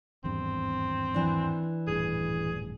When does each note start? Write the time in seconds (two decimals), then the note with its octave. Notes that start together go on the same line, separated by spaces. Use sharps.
0.24 G#1 E2 G2 C4
1.14 E3 D4
1.87 D#1 A1 G2 G#4